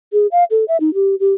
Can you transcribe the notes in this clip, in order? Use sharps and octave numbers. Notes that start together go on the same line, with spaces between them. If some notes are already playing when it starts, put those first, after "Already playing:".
G#4
F5
A4
E5
D#4
G4
G4